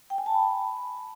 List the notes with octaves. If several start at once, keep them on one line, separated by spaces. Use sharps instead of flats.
G5
G#5
A5
B5